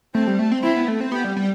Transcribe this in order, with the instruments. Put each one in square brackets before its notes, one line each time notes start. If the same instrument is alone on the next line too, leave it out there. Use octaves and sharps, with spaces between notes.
[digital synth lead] A3 [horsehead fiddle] C4
[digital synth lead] G3
A3
C4
[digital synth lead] C4 [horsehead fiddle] E4
[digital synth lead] B3
A3
C4
[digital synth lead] B3 [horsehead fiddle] G4
[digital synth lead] G3
G3